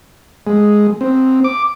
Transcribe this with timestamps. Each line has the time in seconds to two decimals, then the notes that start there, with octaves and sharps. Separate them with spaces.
0.47 G#3
1.01 C4
1.44 D6